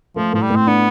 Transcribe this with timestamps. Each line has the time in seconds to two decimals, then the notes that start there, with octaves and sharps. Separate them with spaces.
0.16 F3 A3
0.33 A2 F3
0.42 G3
0.50 A2
0.56 C4
0.67 B3 D4